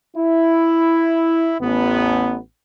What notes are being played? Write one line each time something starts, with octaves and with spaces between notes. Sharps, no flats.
E4
A1 B3